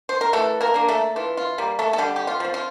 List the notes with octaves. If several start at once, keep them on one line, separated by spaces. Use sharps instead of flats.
C5
A#4
E3 A3 A4
A#3 A#4
A#3 D4
A3 A4
E3 F4
F4
G3 A#3
A3 A4
A4
D3 G3 G4
G4
F4
F3 C4
F4